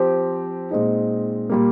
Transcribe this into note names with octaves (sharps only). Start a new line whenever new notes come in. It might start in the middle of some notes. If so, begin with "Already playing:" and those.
Already playing: F3 C4 G4
A#2 G#3 C4 D#4
A#2 G3 A#3